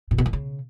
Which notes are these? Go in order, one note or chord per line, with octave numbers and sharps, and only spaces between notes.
A#2
B2
D#3
C#3